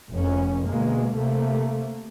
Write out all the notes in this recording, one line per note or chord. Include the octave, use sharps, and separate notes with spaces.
F1 F2 C#4
D2 B2 G#3 A#3
C3 A3 A#3